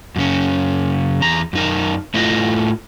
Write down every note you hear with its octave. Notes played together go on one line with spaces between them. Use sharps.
F#2 C#3 C#4
E2 A#5
F#2 D#4 A#4
A2 A3 E4 F4 B4 D#5